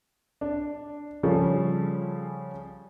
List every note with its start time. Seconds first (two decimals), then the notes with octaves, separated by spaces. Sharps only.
0.41 D4
1.23 C#3 F3 G3 C#4 A4